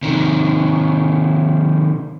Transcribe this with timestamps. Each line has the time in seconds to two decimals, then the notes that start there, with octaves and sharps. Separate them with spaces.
0.03 C3 D#3